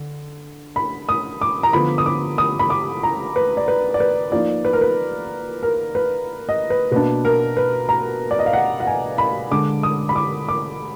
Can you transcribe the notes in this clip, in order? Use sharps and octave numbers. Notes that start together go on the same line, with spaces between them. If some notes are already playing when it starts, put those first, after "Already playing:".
Already playing: D3
B5
D#6
D6
A#5
D3 F3 B3 B5
D#6
D6
D#6
B5
D6
A#5
B4
D5
B4
D5
B4
F3 A#3 D#4 D5
B4
A#4
B4
A#4
B4
D#5
B4
B2 A#3 D4 B4
A#4
B4
A#5
D5
D#5
F5
F#5
F#5
G#5
B5
D3 G#3 D4 D6
D#6
B5
D6
D6